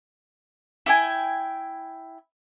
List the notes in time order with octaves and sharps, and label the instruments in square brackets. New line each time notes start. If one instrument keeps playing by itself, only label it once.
[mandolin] E4 G5 G#5